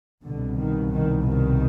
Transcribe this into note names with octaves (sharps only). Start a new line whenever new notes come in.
C2 B2 D3
D#3
D#3
D#3